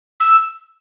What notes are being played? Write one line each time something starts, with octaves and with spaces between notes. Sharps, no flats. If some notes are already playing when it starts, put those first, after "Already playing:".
E6